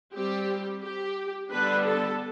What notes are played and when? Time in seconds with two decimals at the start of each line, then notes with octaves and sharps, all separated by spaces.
0.13 G3 C4 G4
0.82 G4
1.51 D3 G3 B3 D4 B4
1.86 A4